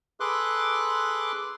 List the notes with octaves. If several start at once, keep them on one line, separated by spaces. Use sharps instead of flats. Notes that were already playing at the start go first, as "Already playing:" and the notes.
G#4 A4 B4 C6 D6 F#6